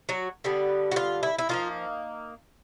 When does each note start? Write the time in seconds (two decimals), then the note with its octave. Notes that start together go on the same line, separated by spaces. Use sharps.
0.09 F#3 F#4
0.44 D3 G3 B3
0.91 F#4
0.96 F4
1.23 E4
1.39 E4
1.49 F3 A#3 D#4 F4